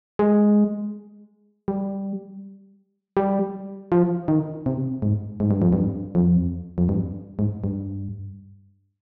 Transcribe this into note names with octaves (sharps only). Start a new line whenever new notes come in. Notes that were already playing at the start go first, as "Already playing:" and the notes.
G#3
G3
G3
F3
D#3
C3
G#2
G#2
G2
F2
G2
F2
F2
G2
G#2
G2